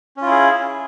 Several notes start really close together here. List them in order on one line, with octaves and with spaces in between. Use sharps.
C#4 F4 E4 G#4